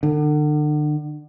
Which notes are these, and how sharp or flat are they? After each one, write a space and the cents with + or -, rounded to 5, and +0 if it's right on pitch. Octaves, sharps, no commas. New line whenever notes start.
D3 +35